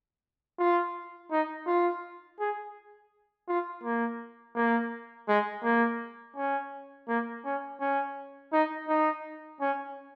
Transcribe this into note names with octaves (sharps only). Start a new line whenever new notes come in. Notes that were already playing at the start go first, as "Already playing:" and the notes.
F4
D#4
F4
G#4
F4
A#3
A#3
G#3
A#3
C#4
A#3
C#4
C#4
D#4
D#4
C#4